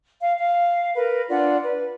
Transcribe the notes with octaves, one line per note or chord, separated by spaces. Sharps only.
F5
F5
A#4 B4
D4 F4 D5 F#5
B4